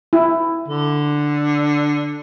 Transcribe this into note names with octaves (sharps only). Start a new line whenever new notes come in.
E4
D3